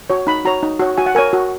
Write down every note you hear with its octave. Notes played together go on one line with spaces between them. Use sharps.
F#4 C#5
D#4 B5
F#4 C#5 A#5
D#4
F#4 C#5
F#4 G#5
F#5
A#4 C#5 G#5
F#4